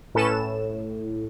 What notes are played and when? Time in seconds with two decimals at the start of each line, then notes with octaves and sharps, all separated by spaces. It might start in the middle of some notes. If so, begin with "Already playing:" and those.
0.15 A2 C#4 A4 B4 A5 E7
0.31 A2